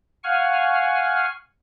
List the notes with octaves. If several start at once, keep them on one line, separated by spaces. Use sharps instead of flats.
F5 F#5 G#5 C#6 F6